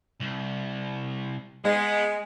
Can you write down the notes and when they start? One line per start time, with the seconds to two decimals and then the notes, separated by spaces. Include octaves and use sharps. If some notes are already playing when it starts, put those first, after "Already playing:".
0.20 C2
1.65 G#3 B3